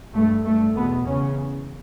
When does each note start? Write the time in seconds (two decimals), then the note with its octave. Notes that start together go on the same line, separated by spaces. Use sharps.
0.14 G2 A3
0.44 G2 A3
0.75 E2 B2 B3
1.05 E2 C#3 C#4